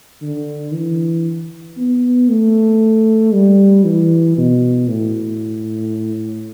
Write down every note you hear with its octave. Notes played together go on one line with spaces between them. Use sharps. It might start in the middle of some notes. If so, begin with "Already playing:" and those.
D3
E3
B3
A3
G3
E3
B2
A2